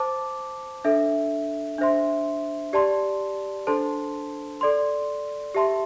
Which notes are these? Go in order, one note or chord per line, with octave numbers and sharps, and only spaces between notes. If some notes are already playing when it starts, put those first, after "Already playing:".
Already playing: C5 A5 D6
D4 A4 E5
D4 C5 E5 C6
G4 D5 A5 C6
D4 A4 C5 A5 C6
A4 D5 C6
G4 E5 A5 C6